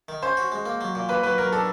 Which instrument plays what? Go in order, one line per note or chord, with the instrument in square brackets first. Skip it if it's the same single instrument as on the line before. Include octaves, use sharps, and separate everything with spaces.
[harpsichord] D#3
[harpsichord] C#4 [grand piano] C5
[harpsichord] F#4
G#3
A#3
F#3
A#2
[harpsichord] A#3 [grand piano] B4
[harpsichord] F#3 [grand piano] B4
[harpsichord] F#3 [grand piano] A#4
[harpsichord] D4 [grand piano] A4